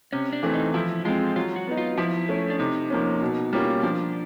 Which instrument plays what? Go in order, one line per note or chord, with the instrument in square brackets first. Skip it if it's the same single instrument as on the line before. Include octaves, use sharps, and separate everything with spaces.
[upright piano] C3 [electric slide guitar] C#4
[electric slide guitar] D4
[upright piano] E3 A3 C4
[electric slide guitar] D#4
[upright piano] F3 [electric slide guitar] E4
[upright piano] G#3 C4 [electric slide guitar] F4
[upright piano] F#3 [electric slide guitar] F4
[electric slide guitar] F#4
[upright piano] B3 D#4
[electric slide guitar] F4
[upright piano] F3 [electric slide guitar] E4
[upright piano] A3 C#4
[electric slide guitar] D4
[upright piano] C3 [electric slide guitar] D#4
[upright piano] F3 A#3 C#4
B2
G3 A#3 C#4 F4
[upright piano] F3 [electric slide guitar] D4